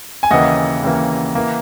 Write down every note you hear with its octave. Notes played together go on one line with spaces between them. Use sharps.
G#5
D#2 C#3 E3 A#3 D#5 F#5
D#2 C#3 E3 A#3
E3 A#3